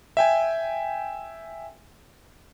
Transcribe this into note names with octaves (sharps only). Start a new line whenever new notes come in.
E5 G5 G#5